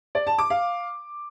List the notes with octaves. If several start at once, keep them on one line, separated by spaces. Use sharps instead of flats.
D5
A5
D6
F5